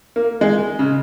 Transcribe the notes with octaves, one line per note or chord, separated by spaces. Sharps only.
A#3
G#3
C#3